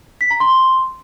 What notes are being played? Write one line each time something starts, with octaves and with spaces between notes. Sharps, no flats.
B6
A#5
C6